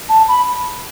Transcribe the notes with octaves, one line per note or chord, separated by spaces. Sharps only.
A5
B5